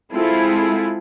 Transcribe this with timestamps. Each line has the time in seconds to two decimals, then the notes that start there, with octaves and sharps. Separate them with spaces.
0.12 G#3 C4 E4 F4 G#4 A4